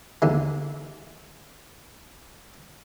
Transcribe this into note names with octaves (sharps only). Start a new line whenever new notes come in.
D#2 D3 G#3